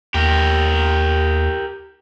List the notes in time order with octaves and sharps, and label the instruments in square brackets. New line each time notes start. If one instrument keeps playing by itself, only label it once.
[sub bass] D#2 [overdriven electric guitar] G4 A#4